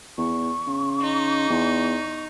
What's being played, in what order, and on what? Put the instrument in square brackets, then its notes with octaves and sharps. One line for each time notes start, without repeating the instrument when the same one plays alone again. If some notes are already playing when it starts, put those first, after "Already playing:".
[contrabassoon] E2 [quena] C#6
[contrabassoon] C#3
[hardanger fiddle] D#4
[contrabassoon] E2